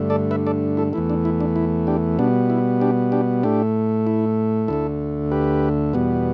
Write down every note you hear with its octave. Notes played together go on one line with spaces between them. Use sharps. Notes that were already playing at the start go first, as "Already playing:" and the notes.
Already playing: G2 D3 A3
A4 D5
B4 E5
A4 D5
E4 A4
E2 E3 A3 E4
D4
E4
D4
E4
D4 G4
B2 G3 B3 D4
E4
D4 G4
D4 G4
A2 A3 D4 G4
E4
D2 D3 A3 E4 A4
G4 B4
E2 B2 G3 B3